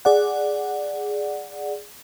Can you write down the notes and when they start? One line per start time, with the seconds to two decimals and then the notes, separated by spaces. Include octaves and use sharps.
0.05 G#4 D5 F#5